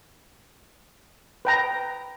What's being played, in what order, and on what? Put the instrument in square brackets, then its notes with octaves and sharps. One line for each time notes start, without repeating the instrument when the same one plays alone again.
[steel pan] B4 G5 A#5